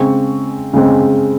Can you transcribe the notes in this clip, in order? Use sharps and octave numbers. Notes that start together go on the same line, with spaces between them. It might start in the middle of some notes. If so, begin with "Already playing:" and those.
Already playing: C#3 G#3 C4 C#6
C#3 G#3 C4